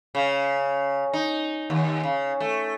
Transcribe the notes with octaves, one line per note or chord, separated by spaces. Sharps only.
C#3
D#4
D#2
C#3
A3